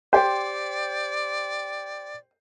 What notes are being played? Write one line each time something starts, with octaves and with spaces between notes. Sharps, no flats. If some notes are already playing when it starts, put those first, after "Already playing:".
G4 C5 D5